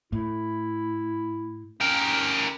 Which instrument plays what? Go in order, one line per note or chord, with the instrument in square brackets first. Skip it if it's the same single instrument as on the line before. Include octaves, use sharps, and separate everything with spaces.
[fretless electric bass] A2 [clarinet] E4
[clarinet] C#4 [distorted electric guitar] G4 A#4